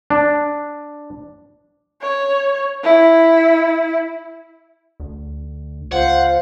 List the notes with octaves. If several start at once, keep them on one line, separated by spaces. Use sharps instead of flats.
D4
C#5
E4
D2
C#2 F4 C5 F#5